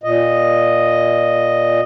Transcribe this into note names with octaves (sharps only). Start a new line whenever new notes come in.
A#2 D#5